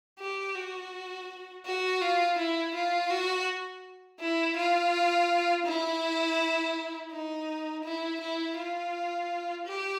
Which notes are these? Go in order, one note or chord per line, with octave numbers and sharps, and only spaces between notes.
G4
F#4
F#4
F4
E4
F4
F#4
E4
F4
E4
D#4
E4
E4
F4
G4